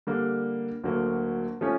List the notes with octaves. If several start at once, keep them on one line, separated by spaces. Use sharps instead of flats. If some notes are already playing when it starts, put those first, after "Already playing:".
D3 G3 A#3
D2 D3 F#3 A#3
F3 A3 C#4